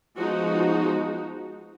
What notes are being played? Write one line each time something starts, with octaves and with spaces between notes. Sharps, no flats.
F3 G#3 B3 D#4 F#4